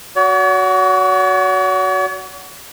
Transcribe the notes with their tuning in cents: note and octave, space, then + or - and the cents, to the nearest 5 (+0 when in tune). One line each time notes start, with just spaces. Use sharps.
F#4 +0 C#5 +45